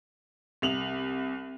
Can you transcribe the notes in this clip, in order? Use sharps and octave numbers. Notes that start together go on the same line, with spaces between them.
C2 F7 F#7